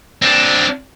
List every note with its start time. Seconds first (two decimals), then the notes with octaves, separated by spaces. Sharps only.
0.22 C4 D4